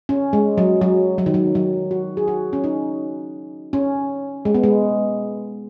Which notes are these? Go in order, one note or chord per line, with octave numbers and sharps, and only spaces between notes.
C#4
G#3
F#3
F#3
F#3
D#3
F#3
F#3
F#4
G#4
F#4
C#4
D#4
C#4
G#3
B3
G#3